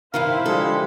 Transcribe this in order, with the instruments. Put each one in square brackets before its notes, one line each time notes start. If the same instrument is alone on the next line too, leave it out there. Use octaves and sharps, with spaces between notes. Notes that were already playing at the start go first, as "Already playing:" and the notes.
[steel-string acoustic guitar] G2 C3 D#3 [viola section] E4 C5 [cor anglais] F5
[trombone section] D3 F3 G3 [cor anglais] G#3 [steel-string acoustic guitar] A4